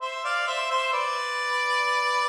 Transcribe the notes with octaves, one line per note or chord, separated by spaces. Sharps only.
C5 E5
D5 F5
C5 E5
C5 E5
B4 D5